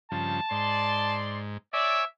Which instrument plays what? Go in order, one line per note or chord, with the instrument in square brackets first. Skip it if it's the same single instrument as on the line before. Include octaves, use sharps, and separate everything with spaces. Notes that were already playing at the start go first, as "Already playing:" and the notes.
[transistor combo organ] G2 C#3 F3 [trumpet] A5
[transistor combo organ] G#2 [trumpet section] D5 C6
[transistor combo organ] C#5 G#5 D6 [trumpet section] D5 [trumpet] E5